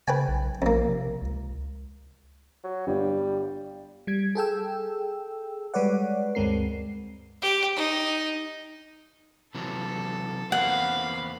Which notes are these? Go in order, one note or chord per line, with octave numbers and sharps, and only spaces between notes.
C#3 B4 G5 G#5
B1
A#1 F2 A#3
C3
C#2
F#3
G1 G3
G3 G#6
G#4 A4 G5 E6
G3 G#3 B4 C#5 D5 F#5
D2 G2 G#3 C4 A#4 C7
G4
D#4
C3 E3 F#3 A4
E2 A#3 C4 F5 F#5 B5